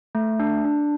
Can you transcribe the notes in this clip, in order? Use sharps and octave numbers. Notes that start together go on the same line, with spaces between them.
A3
D4
D4